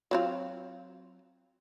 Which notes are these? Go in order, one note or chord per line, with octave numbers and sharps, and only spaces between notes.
F#3 C4 F4